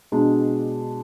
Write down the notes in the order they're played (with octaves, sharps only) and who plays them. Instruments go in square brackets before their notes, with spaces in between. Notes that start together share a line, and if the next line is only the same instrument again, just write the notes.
[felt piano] B2 G#3 D4